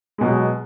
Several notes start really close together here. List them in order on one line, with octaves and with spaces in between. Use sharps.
G#3 B2 F#3